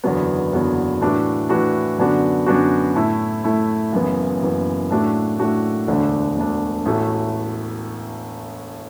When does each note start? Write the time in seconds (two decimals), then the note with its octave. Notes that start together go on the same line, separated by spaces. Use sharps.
0.04 F#1 E2 D3 F#3 B3
0.53 F#1 E2 D3 F#3 B3
1.01 A2 E3 D4 F#4
1.49 A2 E3 D4 F#4
1.98 F#2 D3 B3 D4 F#4
2.46 F#2 D3 B3 D4 F#4
2.96 A2 A3 E4
3.44 A2 A3 E4
3.92 F#1 F#2 E3 B3
4.42 F#1 F#2 E3 B3
4.90 A2 A3 D4 F#4
5.39 A2 A3 D4 F#4
5.87 E1 D2 D3 A3 D4
6.36 E1 D2 D3 A3 D4
6.85 A1 A2 A3 F#4